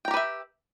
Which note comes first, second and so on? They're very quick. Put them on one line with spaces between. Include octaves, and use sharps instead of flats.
G5 A#5 G4 B4 E5